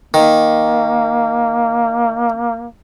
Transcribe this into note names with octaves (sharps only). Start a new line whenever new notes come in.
D#3 A#3